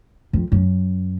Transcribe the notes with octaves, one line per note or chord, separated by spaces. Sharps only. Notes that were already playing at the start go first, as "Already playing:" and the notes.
F2
F#2